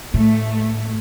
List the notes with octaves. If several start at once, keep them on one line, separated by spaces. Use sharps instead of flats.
A2 A3